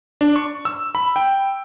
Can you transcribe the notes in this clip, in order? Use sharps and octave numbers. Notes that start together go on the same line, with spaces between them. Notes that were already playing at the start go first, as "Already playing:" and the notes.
D4
C#6
E6
B5
G5